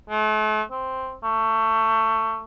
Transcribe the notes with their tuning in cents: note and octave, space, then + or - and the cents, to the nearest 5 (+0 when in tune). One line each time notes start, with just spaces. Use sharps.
A3 -40
C4 +0
A3 +20